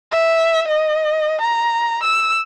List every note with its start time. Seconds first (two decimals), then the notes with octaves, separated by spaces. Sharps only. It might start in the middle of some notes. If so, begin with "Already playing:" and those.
0.12 E5
0.68 D#5
1.41 A#5
2.03 E6